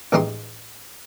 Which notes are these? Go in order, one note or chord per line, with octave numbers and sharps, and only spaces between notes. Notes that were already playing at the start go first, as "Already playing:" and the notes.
A1 E3 G#3 D#4 G4 C6